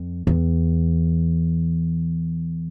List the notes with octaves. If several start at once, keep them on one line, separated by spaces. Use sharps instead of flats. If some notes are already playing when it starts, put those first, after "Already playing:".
Already playing: F2
E2